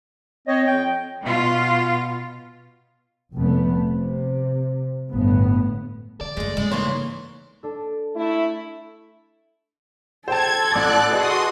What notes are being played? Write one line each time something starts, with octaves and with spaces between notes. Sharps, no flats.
C4 C#5 D#5
F2 G5
B2 F4
F1 A3 B3
C3
G1 A2 B3
D3 D5
F#1 D#2 G#3 A3
C#3 G#3 A3
E3 A#3 D#4 C#5 C6
D4 A4
A3 E4
A4 C5 G5 A5 G#6
A1 D5 D6 F#6 A6
F#4 G#4 B4 D#5 C6 D#6